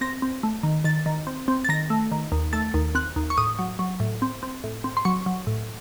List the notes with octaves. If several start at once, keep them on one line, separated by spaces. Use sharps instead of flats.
C4 A#6
C4
A3
D#3
D#3 A6
D#3
C4
C4
A6
D#3 A#6
A3
D#3
D#2
A3 A6
D#2
C4 F#6
D#2
C#6
A2 D#6
F#3
F#3
A2
C4
C4
A2
C4
C6
F#3 C#6
F#3
A2